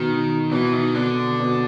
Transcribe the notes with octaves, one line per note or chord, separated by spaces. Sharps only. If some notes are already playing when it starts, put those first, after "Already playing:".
Already playing: B2 D#3
B2 E3
D#3
B2 D3
B2